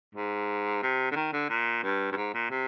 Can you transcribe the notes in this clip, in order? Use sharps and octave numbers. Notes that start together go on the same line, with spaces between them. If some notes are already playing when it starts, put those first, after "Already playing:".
G#2
C3
D3
D#3
D3
A#2
G2
G2
G#2
A#2
C3